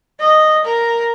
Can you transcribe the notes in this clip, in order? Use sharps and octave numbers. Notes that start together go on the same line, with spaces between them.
D#5
A#4